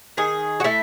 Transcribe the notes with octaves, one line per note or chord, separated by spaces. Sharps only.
D#3 G#4
F#4
A3 E4